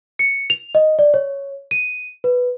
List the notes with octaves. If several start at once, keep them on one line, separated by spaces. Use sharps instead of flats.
C#7
F7
D#5
D5
C#5
D#7
B4